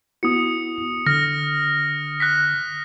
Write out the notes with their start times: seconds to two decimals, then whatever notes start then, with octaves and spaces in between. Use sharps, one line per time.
0.23 B3 E4 F#4 D#6 C#7
1.06 D3 F6 A#6
2.20 F#6 A#6 B6